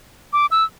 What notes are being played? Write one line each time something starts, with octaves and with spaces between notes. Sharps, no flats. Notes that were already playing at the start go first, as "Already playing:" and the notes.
D6
E6